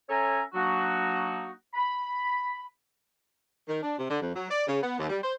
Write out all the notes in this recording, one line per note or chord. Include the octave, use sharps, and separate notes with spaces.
C#4 A4 C#5 E5 G#5 A#5
F#3 A#3 D4 D#4 F#4
B5
D#3
D4
C3
D3
F2
F#3
D5
C#3
B3
D#2
G3
C5